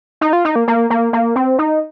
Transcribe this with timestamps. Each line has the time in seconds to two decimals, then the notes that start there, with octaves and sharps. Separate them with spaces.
0.21 D#4
0.33 F4
0.45 D#4
0.56 A#3
0.68 A#3
0.90 A#3
1.13 A#3
1.36 C4
1.59 D#4